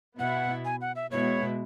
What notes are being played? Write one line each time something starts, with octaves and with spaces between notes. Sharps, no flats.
B2 B3 E4 F#5
G#5
F#5
E5
B2 G#3 B3 E4 C#5